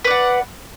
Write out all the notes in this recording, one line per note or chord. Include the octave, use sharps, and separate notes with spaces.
B4 D5 F#5